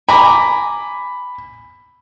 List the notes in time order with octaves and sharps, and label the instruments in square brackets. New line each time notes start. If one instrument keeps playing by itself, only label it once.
[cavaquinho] G#5 A#5 D6 [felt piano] B5